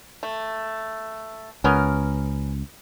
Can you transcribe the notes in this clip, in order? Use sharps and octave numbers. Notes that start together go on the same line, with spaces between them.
A3
C#2 B3 C#4 A#4